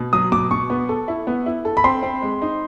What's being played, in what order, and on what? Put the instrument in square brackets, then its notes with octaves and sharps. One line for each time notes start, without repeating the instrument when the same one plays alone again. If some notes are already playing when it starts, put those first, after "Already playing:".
Already playing: [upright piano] B2
[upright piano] F#3 [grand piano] D#6
[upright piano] B2 [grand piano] D6
[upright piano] B2 [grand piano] C#6
[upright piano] B3
A4
E4
B3
E4
A4
[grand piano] B5
[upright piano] C4 [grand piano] C6
[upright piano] C4
G#3
D#4